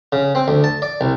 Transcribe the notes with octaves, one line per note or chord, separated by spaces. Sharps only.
C#3
C4
D2
A5
D5
C2